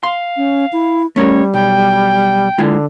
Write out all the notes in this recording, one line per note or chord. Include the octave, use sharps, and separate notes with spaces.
F5 C6
C#4
E4
G3 A3 C#4 A#4 C#5
B1 G5
D3 G#3 E4 F4